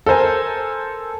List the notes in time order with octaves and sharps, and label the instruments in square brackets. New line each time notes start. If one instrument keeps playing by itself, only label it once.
[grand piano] A4 A#4 C5 G#5